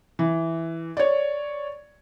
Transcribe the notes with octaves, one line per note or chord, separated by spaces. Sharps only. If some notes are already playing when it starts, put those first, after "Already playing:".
E3
C#5 D5